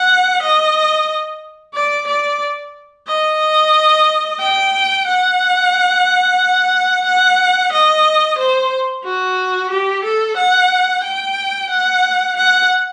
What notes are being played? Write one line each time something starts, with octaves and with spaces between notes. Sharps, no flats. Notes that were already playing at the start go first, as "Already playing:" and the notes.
Already playing: F#5
D#5
D5
D5
D#5
G5
F#5
F#5
D#5
C5
F#4
G4
A4
F#5
G5
F#5
F#5